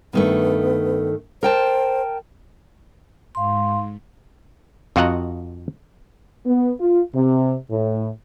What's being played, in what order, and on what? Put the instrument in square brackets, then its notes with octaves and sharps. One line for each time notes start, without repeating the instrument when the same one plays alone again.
[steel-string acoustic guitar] G2 D#3 A3 [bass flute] B3
[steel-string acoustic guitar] A#4 G5 A5 [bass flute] C5
[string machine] G#2 [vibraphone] F5 C6
[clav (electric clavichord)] F2 F4 F#4 D#5 F#5 A#5
[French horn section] B3
F4
C3
A2